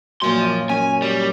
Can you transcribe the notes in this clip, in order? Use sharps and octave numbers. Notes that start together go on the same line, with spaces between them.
F#2 A#2 F3 C6
D#5 D6
C#4 G#5
G3